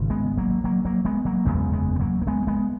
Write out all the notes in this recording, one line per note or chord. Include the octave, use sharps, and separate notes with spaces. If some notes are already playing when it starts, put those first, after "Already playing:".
Already playing: G#1 C#3
G#3 B3
F#3 A#3
F#3 A#3
F#3 A#3
G#3 B3
F#3 A#3
F#1 E2 C#3 G#3 B3
G#3 B3
B3
F#3 A#3
A#3
G#3 B3
A#3
G#3 B3